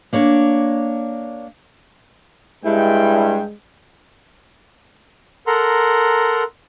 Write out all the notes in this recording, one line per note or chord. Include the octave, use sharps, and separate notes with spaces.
A#3 D4 C#5
G2 G#3 E4 G5
A4 A#4 F#5 A#5 C6